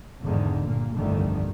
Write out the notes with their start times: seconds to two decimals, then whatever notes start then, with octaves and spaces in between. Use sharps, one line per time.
0.22 E2 G#2 D3 D#3
0.62 G1 A#2 A#3
0.94 G1 C2 F2 D3 D#3 A3